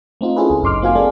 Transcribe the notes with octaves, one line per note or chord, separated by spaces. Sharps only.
A3 C4 D#4 F4
C#4 E4 F4 G#4 A4 B4
C#2
G1 F#2 D#4 C6 D6 F6
A#3 C4 F4 F#4 F5 G#5
A#3 C4 G#4 A4 D5